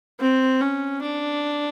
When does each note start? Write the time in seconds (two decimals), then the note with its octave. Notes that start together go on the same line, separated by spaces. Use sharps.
0.20 C4
0.61 C#4
1.03 D4